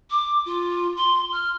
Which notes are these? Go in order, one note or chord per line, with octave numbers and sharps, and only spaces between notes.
D6
F4
C6
F6